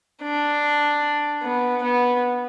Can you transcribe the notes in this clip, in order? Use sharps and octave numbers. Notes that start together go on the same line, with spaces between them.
D4
B3
B3